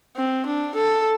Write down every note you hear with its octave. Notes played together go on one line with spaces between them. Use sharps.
C4
D4
A4